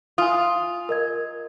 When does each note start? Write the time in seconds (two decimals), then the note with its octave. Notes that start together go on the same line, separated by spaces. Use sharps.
0.18 F4 G#5 D#6
0.89 A#4 D#5 G#6